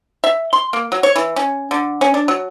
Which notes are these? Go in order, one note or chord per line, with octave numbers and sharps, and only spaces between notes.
E5
C6
A#3
F#3
C#5
E3
C#4
D3
C#4
D4
F#3